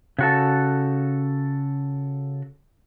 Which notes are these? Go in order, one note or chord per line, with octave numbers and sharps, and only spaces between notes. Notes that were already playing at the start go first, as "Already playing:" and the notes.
C#3 F#4 A4